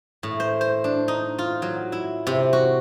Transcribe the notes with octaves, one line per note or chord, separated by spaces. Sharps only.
A2
C5
C5
D4
D#4
F4
F#3
E4
C3
F#4